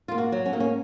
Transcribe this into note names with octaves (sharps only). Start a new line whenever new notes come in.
A#3 F4
F#4
F#3
C#4
A#3 D#4
C#4